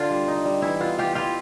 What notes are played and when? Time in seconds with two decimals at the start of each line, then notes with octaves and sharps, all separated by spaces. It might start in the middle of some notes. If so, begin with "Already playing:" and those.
Already playing: D3 F4
0.10 G3
0.28 D#4
0.45 G3
0.62 E3 E4
0.80 B3 F4
0.98 E3 F4 G4
1.15 E4 F4 G4